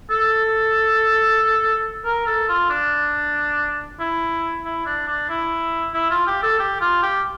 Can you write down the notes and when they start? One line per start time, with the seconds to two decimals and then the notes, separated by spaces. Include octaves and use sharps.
0.10 A4
2.05 A#4
2.26 A4
2.49 F4
2.70 D4
4.00 E4
4.65 E4
4.86 D4
5.08 D4
5.29 E4
5.94 E4
6.11 F4
6.27 G4
6.43 A4
6.59 G4
6.81 F4
7.03 G4